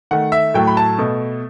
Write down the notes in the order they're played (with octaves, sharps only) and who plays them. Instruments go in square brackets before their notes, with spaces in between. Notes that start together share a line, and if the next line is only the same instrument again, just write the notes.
[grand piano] D#3 A3 F#5
E5
A2 F#3 A3 G5
B5
A5
B2 A3